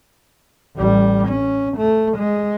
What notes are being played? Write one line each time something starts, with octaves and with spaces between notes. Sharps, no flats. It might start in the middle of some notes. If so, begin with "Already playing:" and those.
A1 G3
C#4
A3
G#3